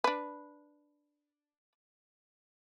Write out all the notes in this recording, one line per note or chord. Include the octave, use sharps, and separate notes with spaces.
D4 B4